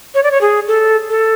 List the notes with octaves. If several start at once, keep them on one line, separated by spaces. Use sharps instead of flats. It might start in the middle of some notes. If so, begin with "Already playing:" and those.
C#5
D5
C#5
G#4
A4
A4